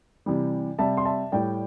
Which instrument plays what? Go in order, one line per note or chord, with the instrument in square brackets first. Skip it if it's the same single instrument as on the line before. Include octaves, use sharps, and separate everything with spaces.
[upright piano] C3 E3 G3
C3 G3 E5 A5
C6
E5 A5
A2 G3 D5 G5